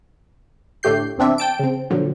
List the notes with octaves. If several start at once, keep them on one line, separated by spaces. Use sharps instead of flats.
A2 D3 A3 G4 G6 C7
E2 C3 C4 D4 E5
G5 A5 D7
C#3 C4
A#2 D3 F3 F#3